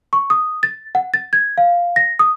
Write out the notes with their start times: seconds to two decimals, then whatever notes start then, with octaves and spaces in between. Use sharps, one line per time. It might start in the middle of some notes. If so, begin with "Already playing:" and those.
0.13 C#6
0.30 D#6
0.63 A6
0.95 F#5
1.14 A6
1.33 G#6
1.58 F5
1.96 A#6
2.19 D#6